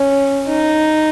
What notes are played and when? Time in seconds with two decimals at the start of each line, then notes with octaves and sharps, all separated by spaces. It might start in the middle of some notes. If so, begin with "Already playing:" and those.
Already playing: C#4
0.47 D#4